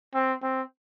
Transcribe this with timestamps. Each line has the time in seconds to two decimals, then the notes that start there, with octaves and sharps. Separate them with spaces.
0.14 C4
0.42 C4